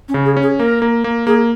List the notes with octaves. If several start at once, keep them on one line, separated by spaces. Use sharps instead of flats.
C#4
C#3
G#4
C#4
G#4
A#3 A#4
A#3
A#3
A#3 G#4